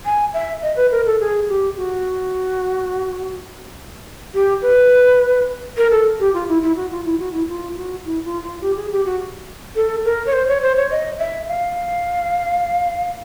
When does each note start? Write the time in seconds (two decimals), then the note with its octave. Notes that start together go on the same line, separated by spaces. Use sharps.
0.05 G#5
0.34 E5
0.62 D#5
0.76 B4
0.91 A#4
1.06 A4
1.20 G#4
1.49 G4
1.77 F#4
4.34 G4
4.62 B4
5.77 A#4
5.91 A4
6.20 G4
6.34 F4
6.48 E4
6.62 E4
6.76 F#4
6.91 F4
7.05 E4
7.19 F#4
7.33 E4
7.49 F4
7.76 F#4
8.05 E4
8.25 F4
8.43 F4
8.62 G4
8.76 G#4
8.91 G4
9.05 F#4
9.76 A4
10.05 A#4
10.26 C#5
10.33 C5
10.48 C#5
10.63 C5
10.77 C#5
10.91 D#5
11.19 E5
11.48 F5